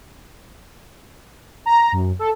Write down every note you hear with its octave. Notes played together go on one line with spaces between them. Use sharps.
A#5
F#2
A4